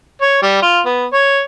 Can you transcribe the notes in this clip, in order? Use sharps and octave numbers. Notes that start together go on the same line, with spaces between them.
C#5
G3
F4
B3
C#5